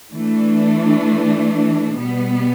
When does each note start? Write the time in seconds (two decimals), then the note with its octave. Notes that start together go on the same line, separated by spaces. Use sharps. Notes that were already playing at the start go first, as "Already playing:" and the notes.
0.11 E3 A3 D4
1.96 B2 G3 B3